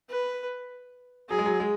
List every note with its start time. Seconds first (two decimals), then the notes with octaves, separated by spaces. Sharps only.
0.09 B4
1.29 F#3 G#4
1.39 G#3
1.46 F#3
1.60 G#3